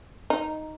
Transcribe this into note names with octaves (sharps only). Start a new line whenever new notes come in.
D#4